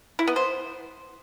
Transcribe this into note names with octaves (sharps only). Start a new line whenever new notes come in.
E4
B3
C5